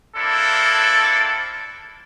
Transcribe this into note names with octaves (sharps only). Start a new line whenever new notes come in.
A#3 C4 D4 E4 A4